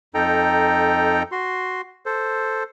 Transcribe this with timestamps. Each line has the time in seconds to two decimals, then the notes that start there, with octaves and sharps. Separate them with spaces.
0.15 F2 D#4 A4 G5 A#5
1.32 F#4 C6
2.06 A4 C5